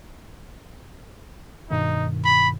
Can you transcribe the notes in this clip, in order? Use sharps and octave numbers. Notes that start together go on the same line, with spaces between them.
G2 B2 D#3 D#4
B5